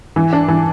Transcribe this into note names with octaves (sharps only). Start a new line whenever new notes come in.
E3
D4
E3